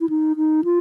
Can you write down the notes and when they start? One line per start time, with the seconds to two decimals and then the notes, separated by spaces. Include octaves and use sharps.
0.01 E4
0.09 D#4
0.37 D#4
0.64 F4